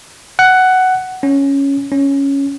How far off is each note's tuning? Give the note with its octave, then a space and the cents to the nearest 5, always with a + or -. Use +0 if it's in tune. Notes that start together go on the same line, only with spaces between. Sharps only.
F#5 +10
C#4 +0
C#4 +0